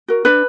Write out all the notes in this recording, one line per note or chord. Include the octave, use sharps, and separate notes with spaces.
F#4 A#4
D4 B4